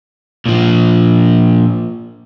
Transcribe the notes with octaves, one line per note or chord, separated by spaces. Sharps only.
A#2 F3